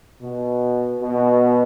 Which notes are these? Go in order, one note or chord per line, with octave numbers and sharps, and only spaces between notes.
B2
B2